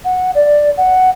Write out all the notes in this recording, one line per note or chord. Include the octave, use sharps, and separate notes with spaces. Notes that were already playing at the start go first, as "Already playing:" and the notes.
F#5
D5
F#5